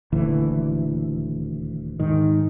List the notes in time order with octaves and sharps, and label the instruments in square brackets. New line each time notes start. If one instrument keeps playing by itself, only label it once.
[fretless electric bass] D#1 D2 E3
G#2 D#3